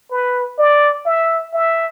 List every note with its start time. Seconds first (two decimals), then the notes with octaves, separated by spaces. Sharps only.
0.11 B4
0.58 D5
1.05 E5
1.53 E5